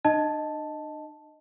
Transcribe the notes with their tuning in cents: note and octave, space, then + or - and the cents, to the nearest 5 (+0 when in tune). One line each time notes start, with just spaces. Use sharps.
D4 +45 D#5 +0 A5 +0